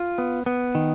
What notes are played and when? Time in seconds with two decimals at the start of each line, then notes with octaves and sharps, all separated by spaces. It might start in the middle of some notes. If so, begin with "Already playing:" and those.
Already playing: F4
0.18 B3
0.46 B3
0.75 D#3